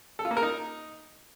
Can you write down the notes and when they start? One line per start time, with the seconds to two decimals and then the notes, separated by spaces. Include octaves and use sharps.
0.19 A4
0.25 F4
0.31 A#3
0.37 A#4
0.43 D#4